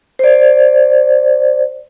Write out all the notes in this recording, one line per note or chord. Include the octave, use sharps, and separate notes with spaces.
C5 D5